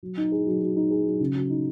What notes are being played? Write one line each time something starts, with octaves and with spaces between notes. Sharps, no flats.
F#3
D#4
G#4
F#3
F#3
D#4
G#4
F#3
C#3
F#3
D#4